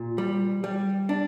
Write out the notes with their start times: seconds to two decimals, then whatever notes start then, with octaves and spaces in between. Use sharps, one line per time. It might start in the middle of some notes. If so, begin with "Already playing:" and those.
Already playing: A#2
0.18 G3
0.64 G3
1.09 D4